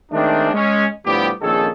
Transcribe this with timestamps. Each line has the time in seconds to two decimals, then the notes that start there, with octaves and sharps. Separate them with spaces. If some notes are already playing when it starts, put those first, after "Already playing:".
0.12 D#3 G#3 A3 C4 D4
0.54 G#3 C#4
1.05 A2 D3 F3 G3 B3 G4
1.41 A#1 F2 D#3 C#4 G#4 A4